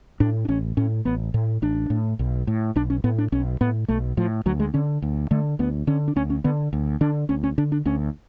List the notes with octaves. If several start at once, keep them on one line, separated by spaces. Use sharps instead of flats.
A2 D4
D4
A1 C#4
A2 C#4
A1 B3
A2
A1 D4
A2
B1
A2
B1 D4
C#4
A2 B3
D4
B1 C#4
A2 B3
B1 A3
A2 F3
D2 F#3
G#3
D3 C#4
D2
D3 A3
D2 B3
D3 C#4
D4
D2 C#4
C#4
D3 B3
D2
D3 D4
D2 C#4
C#4
D3 D4
D4
D2 C#4